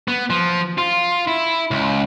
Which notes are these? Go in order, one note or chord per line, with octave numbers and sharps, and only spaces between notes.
B3
F3
F4
E4
C#2